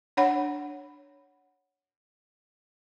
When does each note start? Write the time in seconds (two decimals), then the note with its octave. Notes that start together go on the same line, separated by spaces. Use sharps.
0.17 D4 C#5 F#5 B5